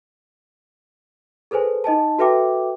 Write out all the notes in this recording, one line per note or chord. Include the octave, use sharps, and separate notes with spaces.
G#4 A4 B4 C5 G#5
D#4 D#5 G#5 A5
F#4 A4 B4 E5 G5 D6